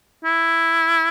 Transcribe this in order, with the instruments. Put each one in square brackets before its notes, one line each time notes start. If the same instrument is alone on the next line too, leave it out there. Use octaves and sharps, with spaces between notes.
[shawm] E4